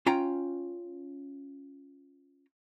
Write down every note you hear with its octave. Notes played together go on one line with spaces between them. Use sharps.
C#4 F4 G5 A#5